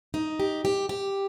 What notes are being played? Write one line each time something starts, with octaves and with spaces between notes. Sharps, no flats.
D#4
G4
G4
G4